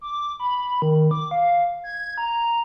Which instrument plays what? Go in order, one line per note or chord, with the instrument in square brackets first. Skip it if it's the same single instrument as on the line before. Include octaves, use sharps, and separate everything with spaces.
[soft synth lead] D6
B5
D#3
D6
F5
G#6
A#5